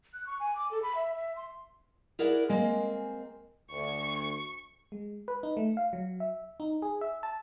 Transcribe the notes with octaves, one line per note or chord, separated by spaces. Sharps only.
F#6
C#6
G#5
D6
A4
B5
E5
E5
C6
E4 G#4 A#4 D5 F#5
G#3 A#3 C4 G#5
D2 C#6
G#3
B4
D#4
A3
F5
F#3
E5
D#4
G#4
E5
A5